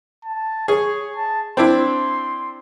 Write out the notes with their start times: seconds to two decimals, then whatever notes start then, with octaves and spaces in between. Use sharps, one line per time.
0.25 A5
0.68 G#4 C#5
1.17 A5
1.57 C4 D4 E4 C6